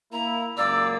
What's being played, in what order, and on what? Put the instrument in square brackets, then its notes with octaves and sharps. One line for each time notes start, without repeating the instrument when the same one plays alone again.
[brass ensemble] A#3 E4 [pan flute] A#5
[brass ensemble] C#2 F#2 A#3 [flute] D5 [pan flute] E6